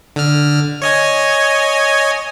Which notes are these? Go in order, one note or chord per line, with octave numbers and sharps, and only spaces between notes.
D3 F6
C#5 D#5 G#5